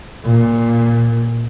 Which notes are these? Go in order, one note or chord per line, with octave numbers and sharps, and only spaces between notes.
A#2